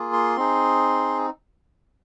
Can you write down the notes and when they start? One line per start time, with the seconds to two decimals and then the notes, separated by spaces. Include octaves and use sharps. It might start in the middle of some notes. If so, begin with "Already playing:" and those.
Already playing: A#3 F4 G#4
0.13 C6
0.36 C4 D#4 G#4